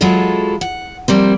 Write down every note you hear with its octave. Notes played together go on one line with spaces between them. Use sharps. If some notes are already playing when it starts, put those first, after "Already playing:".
F#3 G#3 E4 F4 A4
F#5
F3 G3 A#3 C4